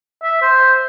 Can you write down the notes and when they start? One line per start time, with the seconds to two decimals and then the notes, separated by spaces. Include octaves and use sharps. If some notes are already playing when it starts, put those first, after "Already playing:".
0.23 E5
0.42 C5